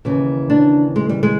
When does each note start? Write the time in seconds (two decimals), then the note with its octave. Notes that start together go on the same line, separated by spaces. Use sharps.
0.05 D#2 C#3 E3
0.50 D4
0.96 G#3
1.09 G3
1.23 G#3